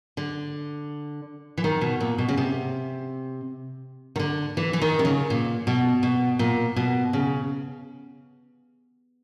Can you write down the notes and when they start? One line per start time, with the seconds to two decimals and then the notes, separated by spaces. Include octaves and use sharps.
0.17 D3
1.58 E3
1.64 D#3
1.81 B2
2.01 A#2
2.18 B2
2.29 C#3
2.37 C3
4.16 D#3
4.19 D3
4.57 E3
4.73 E3
4.81 D#3
4.99 C3
5.05 C#3
5.30 A#2
5.67 B2
6.03 B2
6.39 A#2
6.76 B2
7.13 C#3